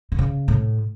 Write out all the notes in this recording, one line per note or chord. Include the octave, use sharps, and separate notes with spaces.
C3
C#3
A2